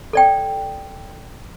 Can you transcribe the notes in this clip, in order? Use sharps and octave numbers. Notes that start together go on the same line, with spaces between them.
A4 D5 G5